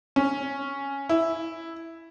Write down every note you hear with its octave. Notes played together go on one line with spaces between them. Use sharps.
C#4
E4